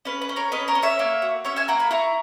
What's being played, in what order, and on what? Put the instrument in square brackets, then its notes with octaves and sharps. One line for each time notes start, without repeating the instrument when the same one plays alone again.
[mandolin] C#4 B4
B4
C#4
A#4 C#5
C#4 B4 D#5
A#4 C#5
C#4
C#5 E5
A#3
F#4
C#4 C#5 E5
E5 G#5
A#3 F#5 A#5
G#5 B5
E4 A#5 C#6